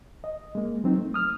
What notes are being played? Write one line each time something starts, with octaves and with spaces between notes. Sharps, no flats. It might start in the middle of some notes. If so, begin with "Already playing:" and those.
D#5
G#3 A#3
F#3 C4 D#4
A3
D#6 F6